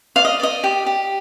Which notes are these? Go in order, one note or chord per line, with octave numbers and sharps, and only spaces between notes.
D5 F5
D#5
D5 D#5
G4
G4